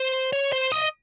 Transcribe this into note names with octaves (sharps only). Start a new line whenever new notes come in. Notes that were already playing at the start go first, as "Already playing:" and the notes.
Already playing: C5
C#5
C5
D#5